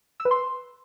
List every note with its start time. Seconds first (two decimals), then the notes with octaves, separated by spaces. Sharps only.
0.20 E6
0.25 B4
0.31 C6